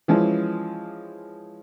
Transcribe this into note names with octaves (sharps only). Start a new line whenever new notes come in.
E3 F3 G#3 C#4